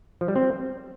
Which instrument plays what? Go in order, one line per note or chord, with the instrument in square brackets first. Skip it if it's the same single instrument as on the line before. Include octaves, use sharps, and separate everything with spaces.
[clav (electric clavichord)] F3
G3
C4